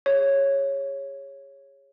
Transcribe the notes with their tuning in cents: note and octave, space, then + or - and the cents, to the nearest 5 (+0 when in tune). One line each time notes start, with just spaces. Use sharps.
G#4 -30 C#5 -5